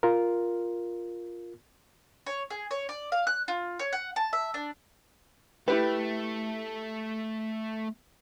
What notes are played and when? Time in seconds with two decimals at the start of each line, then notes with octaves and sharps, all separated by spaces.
0.03 F4 A#4
2.26 C#5
2.50 G#4
2.71 C#5
2.89 D5
3.12 F5
3.27 F#6
3.48 F4
3.79 C#5
3.92 F#5
4.16 A5
4.33 E5
4.54 D4
5.68 A3 E4 G4 B4